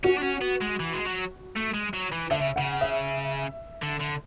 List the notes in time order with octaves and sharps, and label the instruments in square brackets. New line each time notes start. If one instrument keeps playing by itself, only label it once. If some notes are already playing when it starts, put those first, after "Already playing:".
[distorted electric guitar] C#4 [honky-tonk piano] F#4
[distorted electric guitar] D4
C#4
B3
G#3
E3
G#3
F#3
A3
G#3
F#3
E3
[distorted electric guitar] D3 [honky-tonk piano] E5
[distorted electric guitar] C#3
[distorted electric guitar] C#3 [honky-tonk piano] F#5
[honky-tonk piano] E5
[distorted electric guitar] D3
D3